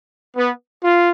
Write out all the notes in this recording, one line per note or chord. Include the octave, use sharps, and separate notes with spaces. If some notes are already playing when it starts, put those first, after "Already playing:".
B3
F4